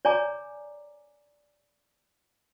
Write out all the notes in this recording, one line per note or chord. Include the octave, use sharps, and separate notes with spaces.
C#5 D5 G#5 A#5 D6